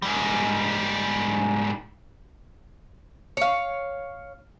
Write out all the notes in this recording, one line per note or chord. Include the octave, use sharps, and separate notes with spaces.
G#2 G3
C#5 F5